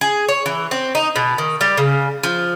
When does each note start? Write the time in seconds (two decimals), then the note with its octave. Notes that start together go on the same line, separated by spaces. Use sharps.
0.01 G#4
0.29 C#5
0.46 E3
0.71 C4
0.95 D#4
1.16 B2
1.38 D#3
1.61 G3
1.77 C#3
2.23 F3